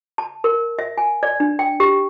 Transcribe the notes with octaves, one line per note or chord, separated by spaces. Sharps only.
A5
A#4
E5
G#5
D5
D4
G5
G4